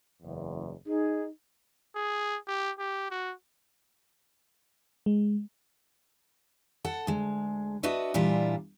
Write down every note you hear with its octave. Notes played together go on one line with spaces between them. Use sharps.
F#1 E2
D#4 G#4
G#4
G4
G4
F#4
G#3
A4 F#5 A5
D2 G#3
D4 F#4 B4 D#5 E5
A#2 E3 G3 D4 E4 F4